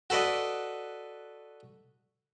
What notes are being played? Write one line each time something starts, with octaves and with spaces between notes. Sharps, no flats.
F#4 A4 B4 D5 D#5